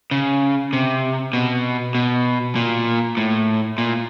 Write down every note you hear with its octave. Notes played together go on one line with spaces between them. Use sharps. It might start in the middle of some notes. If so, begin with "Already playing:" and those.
C#3
C3
B2
B2
A#2
A2
A#2